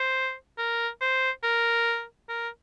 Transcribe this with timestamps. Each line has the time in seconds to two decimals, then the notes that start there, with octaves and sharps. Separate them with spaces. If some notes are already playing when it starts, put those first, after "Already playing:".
Already playing: C5
0.59 A#4
1.01 C5
1.43 A#4
2.29 A#4